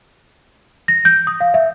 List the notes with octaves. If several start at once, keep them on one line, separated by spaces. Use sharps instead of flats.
A#6
G6
D#6
F5
E5